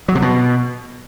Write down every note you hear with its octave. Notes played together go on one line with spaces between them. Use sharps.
F#3
C3
B2